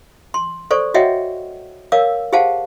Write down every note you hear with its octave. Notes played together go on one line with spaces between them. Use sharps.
C6
A4 C5 D5 C#6
F#4 C#5 D#5 E5 F#5 G5
A#4 C#5 F5 D6 E6
G4 G#4 C5 F5 F#5 A5